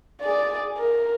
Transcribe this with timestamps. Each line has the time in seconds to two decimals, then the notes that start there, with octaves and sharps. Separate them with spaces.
0.21 G#4 D5
0.77 A#4